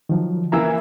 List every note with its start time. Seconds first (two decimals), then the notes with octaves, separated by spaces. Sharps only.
0.09 D#3 F3 F#3
0.52 E3 A#3 E4 A#5 E6